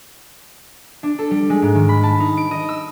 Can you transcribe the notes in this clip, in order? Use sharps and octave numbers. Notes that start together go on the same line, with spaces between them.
D4
A4
G3
G#3
G#2
D#3
B5
A5
D#4
D7
D#5
E6